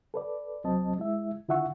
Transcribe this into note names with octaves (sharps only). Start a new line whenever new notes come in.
A4 B4 D5
C2 F#3 C4 D#5 A5
G#3 E4 E5
D3 E4 F4 E5 F#5 C#6